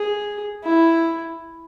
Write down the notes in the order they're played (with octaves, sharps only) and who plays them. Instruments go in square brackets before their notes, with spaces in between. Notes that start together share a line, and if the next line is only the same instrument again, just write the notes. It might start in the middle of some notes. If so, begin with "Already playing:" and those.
Already playing: [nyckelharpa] G#4
E4